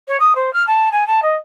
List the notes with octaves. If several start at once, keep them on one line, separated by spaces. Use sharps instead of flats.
C#5
D#6
C5
F6
A5
G#5
A5
D#5